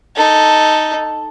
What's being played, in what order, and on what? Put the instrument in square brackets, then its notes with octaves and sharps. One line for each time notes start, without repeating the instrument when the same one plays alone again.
[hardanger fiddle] D#4 A4